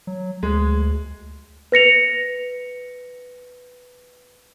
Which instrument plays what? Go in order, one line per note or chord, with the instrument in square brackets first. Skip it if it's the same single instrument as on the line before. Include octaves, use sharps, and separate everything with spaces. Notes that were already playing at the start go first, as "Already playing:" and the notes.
[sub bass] F#3
[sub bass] D2 [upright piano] G#3
[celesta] B4 A#6 C#7 F7